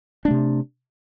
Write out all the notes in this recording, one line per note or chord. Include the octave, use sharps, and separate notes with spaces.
C3 A3 D4